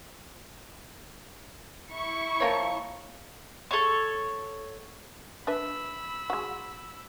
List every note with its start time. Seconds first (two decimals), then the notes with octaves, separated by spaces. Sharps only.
1.93 E4 C#6
2.40 F3 A#3 C#5
3.71 A4 C#5
5.47 D4 B4 E5 B5 E6
6.30 G#3 F#4